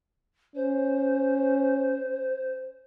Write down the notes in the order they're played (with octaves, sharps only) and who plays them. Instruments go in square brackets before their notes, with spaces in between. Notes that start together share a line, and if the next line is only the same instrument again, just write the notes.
[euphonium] C#4 [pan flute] C5